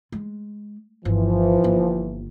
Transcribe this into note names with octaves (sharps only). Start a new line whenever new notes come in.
G#3
G1 E3 F3
G1 A#3